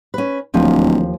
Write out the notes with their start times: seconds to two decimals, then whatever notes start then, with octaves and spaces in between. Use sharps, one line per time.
0.14 C#4 B4
0.54 D1 D#2 F3